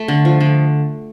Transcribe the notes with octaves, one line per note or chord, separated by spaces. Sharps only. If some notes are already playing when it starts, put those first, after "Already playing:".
Already playing: A3
D3
F3
D3